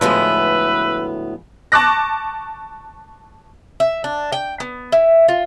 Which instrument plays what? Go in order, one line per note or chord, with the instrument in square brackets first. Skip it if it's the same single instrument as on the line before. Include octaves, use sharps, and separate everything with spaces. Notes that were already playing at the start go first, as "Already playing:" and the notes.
[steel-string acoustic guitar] D2 A2 B3 [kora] F3 G#3 [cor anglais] B4 [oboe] E5
[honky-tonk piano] A5 C#6 D6 F#6 A#6
[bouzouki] E5
D4
G5
B3
E4
F4